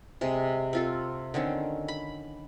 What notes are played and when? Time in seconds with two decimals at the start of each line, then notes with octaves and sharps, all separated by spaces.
0.21 C3 G#3
0.73 C4 F4 A4
1.34 D3 D#3 C4 C#4
1.88 B5